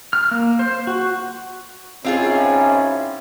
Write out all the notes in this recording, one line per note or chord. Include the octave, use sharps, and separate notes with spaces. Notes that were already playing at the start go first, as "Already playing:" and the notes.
F6
A#3
C5
F#4
G#1 C4 C#4 E4 F4 G#4